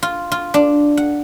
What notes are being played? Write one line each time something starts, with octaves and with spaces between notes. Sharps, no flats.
F4
F4
D4
F#5